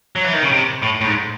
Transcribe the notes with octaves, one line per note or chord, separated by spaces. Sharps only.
F#3
E3
D#3
C#3
C3
A2
A2
G#2